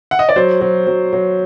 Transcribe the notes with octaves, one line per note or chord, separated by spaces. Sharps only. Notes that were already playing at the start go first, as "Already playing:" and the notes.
F#5
D#5
D5
F#3 C5
F#3
F#3
F#3